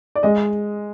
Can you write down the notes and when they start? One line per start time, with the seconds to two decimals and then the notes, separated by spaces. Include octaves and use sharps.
0.15 D5
0.23 G#3 D#5